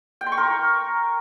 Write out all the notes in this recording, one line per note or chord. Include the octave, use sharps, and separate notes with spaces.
G5
C6
C#6
A#4